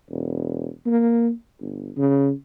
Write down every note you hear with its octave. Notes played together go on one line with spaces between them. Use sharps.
E1
A#3
G1
C#3